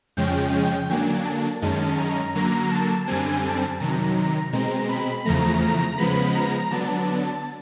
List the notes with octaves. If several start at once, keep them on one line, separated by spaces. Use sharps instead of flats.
F2 C#3 F3 G#3 C#4 G5
D3 F#3 A#3 D4 G#5
A5
F#2 D#3 G#3 C#4 A5
A#5
D3 F#3 A#3 A#5
A5
F#2 D3 G3 C4 G#5
A5
C3 D#3 F#3 A#5
A#5
B2 G#3 C4
B5
E2 C#3 F3 A3 A#5
A#5
C#3 F3 G#3 B3 B5
A#5
D3 F#3 B3 D4 A5